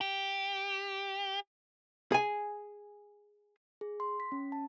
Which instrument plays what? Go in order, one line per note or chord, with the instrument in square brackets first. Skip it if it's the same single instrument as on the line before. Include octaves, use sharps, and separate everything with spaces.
[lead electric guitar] G4
[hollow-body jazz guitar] G#4 G#5
[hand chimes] G#4
C6
B6
C#4
A5